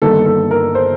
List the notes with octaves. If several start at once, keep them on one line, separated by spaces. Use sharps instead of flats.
G1 G2 D#3 A#3 D#4 A4
A4
A#4
C5